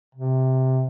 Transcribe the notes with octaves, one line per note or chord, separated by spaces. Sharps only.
C3